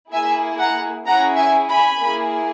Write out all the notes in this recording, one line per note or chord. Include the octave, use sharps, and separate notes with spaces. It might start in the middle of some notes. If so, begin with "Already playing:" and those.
A#3 E4 G#4 E5 G#5
F#5 A#5
C#4 E4 G#4 F#5 A#5
E5 G#5
G#5 B5
A#3 E4 G#4